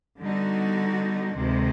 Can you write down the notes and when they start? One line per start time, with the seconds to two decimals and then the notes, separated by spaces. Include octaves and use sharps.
0.21 D3 G3 B3 D#4 F#4
1.33 D2 C3 D#3 G#3